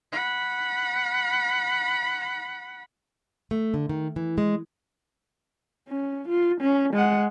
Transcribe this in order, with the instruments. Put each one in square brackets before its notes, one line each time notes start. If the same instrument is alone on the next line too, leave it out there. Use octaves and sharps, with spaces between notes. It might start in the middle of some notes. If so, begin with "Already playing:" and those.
[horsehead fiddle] F#5 B5
[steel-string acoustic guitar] A3
D3
D#3
E3
G#3
[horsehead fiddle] C#4
F4
C#4
G#3 F#5